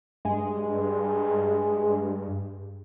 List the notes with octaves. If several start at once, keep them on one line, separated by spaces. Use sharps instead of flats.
G2 G#3